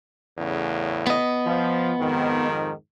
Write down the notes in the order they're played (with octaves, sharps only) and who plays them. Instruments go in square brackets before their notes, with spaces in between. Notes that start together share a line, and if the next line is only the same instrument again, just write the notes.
[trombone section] E2 A2 C#3
[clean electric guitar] B3 D#5
[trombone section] F3
F2 G#2 D#3